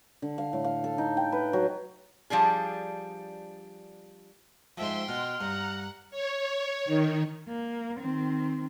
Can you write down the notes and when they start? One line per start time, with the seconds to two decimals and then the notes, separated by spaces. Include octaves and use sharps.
0.22 D3
0.38 F5
0.53 A2
0.64 F5
0.84 A4
0.98 D#4
1.17 G5
1.32 B4
1.53 F#3
2.30 F3 G3 D4 G#4
4.78 G#2 F3 E5 G5 C6
5.09 B2 F#5 F6
5.41 G2 F#5 A#5
6.10 C#5
6.85 D#3
7.48 A#3
8.00 D#3 C4